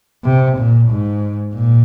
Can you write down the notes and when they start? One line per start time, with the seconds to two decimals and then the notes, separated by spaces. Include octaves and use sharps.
0.24 C3
0.58 A#2
0.90 G#2
1.54 A#2